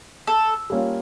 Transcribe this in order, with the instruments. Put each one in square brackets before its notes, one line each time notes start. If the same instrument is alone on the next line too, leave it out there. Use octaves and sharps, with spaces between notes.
[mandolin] A4
[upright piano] G3 A#3 C#4 F4